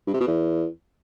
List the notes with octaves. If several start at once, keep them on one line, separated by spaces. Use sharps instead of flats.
G2
C3
B2
E2